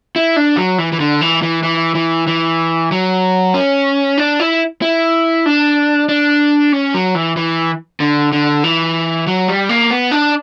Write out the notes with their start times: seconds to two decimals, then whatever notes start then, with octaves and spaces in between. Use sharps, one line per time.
0.16 E4
0.36 D4
0.57 F#3
0.78 E3
0.92 E3
1.00 D3
1.21 E3
1.42 E3
1.63 E3
1.95 E3
2.27 E3
2.92 F#3
3.54 C#4
4.18 D4
4.40 E4
4.82 E4
5.46 D4
6.09 D4
6.72 C#4
6.94 F#3
7.15 E3
7.37 E3
8.00 D3
8.32 D3
8.64 E3
9.27 F#3
9.48 G3
9.69 A#3
9.91 B3
10.11 D4